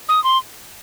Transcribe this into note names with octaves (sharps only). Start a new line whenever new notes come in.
D#6
C6